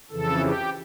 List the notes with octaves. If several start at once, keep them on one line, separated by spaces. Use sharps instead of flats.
F2 C#3 E3 A4
G4